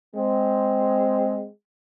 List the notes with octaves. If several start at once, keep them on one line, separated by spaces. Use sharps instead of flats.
G#3 C4